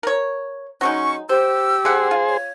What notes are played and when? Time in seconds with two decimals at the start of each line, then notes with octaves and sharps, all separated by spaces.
0.03 A#4 C#5
0.81 F#3 G#3 C#4 D#4 C#6
1.29 G4 C5 E6
1.85 D3 G#4 C5 F#5
2.11 F4
2.27 C#5